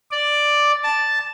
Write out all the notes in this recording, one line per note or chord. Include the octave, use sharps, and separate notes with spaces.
D5
A5